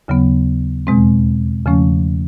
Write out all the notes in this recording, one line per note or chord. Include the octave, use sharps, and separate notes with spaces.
D#2 C#3 F#3 B3
E2 B2 G#3 C4
E2 C#3 F3 A3 C#4